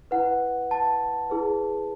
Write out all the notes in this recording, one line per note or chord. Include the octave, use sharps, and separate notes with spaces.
E4 B4 F#5
A5
E4 G#4 B4